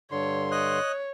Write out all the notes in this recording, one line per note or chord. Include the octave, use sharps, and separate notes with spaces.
G2 D3 C#5 C6
C#5 D#5 F#6